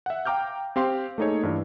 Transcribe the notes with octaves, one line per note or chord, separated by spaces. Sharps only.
E5 F#5
F5 G5 A#5 D6 F6 G6
C4 G4 F5 C6
A3 A#3 D#4 G#4 C#5
G2 E3